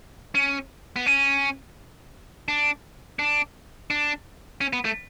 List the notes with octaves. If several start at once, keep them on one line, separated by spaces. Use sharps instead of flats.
C#4
B3
C#4
D4
D4
D4
C#4
B3
A3